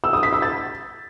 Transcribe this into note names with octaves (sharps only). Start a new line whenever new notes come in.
E6
D#6
B6
E6
A6